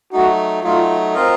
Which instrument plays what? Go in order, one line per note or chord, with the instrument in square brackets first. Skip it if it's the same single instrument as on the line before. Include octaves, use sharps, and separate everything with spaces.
[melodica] F#3 A3 D#4 [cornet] F#4
[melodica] F#3 A3 D#4 [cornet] F4
[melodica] C4 F4 A#4 D#5